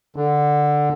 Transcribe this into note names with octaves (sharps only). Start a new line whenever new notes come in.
D3